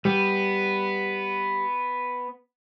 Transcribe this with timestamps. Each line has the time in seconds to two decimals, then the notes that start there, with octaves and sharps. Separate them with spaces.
0.05 G3 B3